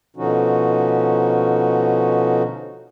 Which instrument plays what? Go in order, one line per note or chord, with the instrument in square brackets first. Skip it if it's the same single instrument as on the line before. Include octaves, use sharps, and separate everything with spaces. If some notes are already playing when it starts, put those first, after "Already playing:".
[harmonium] B2 D3 F3 C#4 D#4 F#4